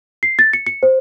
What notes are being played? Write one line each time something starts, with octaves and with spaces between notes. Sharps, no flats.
C7
A6
C#7
C#7
C5